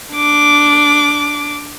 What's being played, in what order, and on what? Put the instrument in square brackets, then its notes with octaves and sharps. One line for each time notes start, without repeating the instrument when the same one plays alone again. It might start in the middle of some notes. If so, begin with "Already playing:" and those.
[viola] D4 D6